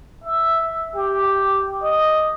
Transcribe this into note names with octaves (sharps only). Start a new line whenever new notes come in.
E5
G4
D#5